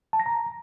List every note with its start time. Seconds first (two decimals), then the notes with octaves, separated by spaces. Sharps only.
0.13 A5
0.20 A#6
0.26 A#5